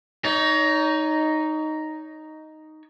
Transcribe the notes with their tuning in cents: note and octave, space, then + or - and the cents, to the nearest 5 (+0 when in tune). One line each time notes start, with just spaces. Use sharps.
D#4 +0 C#5 +35